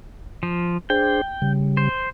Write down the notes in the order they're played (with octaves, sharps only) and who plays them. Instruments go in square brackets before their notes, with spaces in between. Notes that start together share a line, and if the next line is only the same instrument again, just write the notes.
[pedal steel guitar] F3
[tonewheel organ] D4 G#4 C5 [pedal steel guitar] G5
[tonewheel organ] C#3 G3
[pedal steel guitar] C5